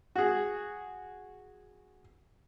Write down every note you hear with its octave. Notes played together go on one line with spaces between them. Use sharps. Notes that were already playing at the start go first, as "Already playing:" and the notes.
F#4 G#4